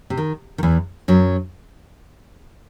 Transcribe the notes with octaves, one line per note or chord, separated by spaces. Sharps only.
C3
D#3
D#3
E2 E3
F#2 F#3